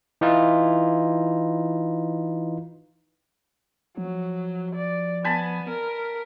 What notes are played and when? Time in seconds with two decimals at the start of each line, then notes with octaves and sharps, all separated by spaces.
0.21 E3 D#4 F4
3.97 F3 F#3
4.75 D5
5.24 B3 G#5 A5 B5
5.69 A#4